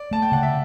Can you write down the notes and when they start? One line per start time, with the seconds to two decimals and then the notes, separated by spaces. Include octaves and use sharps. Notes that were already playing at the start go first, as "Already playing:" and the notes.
Already playing: D5
0.11 A3 A5
0.22 G5
0.32 C#3 F#5
0.43 E5